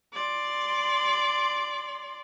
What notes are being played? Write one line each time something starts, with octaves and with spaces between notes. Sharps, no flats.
D5 C6